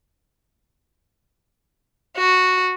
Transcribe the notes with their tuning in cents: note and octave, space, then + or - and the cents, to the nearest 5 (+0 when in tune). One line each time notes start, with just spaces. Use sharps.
F#4 -5